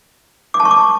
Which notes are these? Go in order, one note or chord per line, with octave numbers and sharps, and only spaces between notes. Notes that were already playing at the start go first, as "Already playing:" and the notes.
D6
A5
C#6
D6